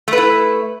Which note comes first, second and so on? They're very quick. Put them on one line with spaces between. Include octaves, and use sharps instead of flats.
A3 B4 E4